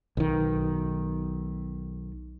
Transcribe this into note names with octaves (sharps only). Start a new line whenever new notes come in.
B1 D#3